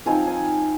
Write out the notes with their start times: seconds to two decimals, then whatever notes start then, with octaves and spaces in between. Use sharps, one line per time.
0.06 F3 C4 D#4 F5 G#5
0.27 F5 G#5